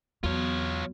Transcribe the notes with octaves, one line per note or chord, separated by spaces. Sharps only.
E2 F#3 B3 F4 F#4 C#5